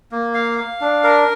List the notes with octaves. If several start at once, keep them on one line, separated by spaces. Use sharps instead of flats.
A#3
F5
F5
D4
A#4